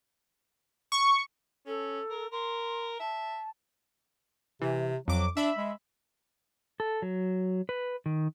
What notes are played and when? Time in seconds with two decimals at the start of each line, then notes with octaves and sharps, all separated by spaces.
0.92 C#6
1.66 C#4 A4
2.10 A#4
2.32 A#4 C6
3.00 E5 A5
4.62 C3 E3
5.08 F2 F#3 D6
5.37 D4 E5 B5
5.58 G#3
6.80 A4
7.02 F#3
7.69 B4
8.06 D#3